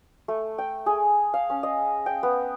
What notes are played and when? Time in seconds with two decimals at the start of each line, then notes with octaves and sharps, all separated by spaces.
0.28 A3
0.58 G5
0.86 G#4
1.34 F5
1.50 C#4
1.63 D#5
2.06 G5
2.23 B3